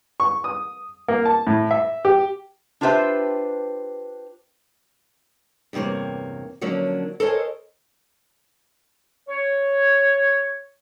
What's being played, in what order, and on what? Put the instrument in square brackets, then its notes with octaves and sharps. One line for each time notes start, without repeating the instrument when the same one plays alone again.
[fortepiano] C#6
D#6
A#3
A5
A2
E5
G4
[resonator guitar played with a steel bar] D4 F4 G4 B4 C5 E5
[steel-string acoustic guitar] E2 G2 C3 A#3 C#5
D3 F3 F#3 A#3 C#4 D4
A4 A#4 C5 C#5 D#5 G#5
[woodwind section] C#5